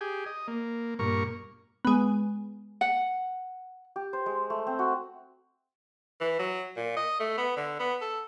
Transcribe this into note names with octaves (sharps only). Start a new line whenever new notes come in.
G4 G#4
D#5
A#3
G2 A#2 A#4 C#6
G#3 B3
F#5
G4
C5
G#3
A3
C4
F#4
E3
F#3
A#2
D#5
A3
B3
D3
B3
A4